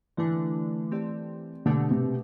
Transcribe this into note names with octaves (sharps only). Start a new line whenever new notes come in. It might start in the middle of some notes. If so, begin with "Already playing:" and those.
D3 E3 A3 D4
A3 C4 G4 D5
B2 D3 A3 D4 G4
C3